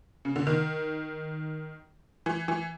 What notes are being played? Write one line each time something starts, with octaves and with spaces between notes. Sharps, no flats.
C#3
D3
D#3
E3
E3